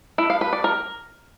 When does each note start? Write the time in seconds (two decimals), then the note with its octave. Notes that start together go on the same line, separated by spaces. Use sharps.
0.18 E4
0.30 F5
0.41 B4
0.53 D5
0.64 A#4